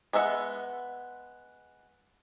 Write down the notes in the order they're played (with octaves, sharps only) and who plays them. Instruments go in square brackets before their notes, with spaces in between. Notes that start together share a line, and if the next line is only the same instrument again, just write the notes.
[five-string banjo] G#3 B3 E5 F#5